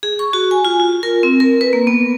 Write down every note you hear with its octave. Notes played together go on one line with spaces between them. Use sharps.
G#4
C#6
F#4
G#5
F4
F4
A#4
C4
A#4
B4
A#3
B3